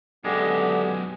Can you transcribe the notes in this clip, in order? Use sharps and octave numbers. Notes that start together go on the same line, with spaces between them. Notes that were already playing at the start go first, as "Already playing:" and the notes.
F#2 B2 D3 G#3 B3 G4